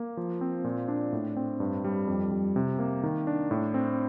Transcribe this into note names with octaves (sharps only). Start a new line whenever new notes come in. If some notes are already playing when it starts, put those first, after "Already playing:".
Already playing: A#3
F3
C4
A#2
D4
A2
C4
G2
G3
F2
G3
C3
A#3
D#3
D4
A2
C4